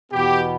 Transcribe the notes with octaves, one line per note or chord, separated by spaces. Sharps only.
E2 B2 B3 G4